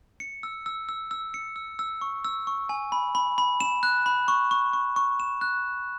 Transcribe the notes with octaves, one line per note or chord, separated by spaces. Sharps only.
C#7
E6
E6
E6
E6
C#7
E6
E6
C#6
E6
C#6
G#5
B5
B5
B5
E7
F#6
B5
C#6
C#6
C#6
C#6
E7
F#6